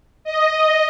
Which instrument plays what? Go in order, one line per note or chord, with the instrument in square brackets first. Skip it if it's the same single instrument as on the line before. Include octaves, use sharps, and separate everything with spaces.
[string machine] D#5